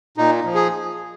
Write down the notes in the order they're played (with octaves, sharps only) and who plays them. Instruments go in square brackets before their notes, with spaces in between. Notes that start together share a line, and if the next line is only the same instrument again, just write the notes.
[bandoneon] A#2 D#4
F3
G#4